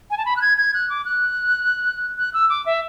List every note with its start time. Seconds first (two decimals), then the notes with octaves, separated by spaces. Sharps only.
0.10 G#5
0.18 A5
0.25 B5
0.36 F#6
0.41 G#6
0.57 G#6
0.74 F#6
0.90 D6
1.05 F#6
2.18 F#6
2.34 E6
2.49 D6
2.66 E5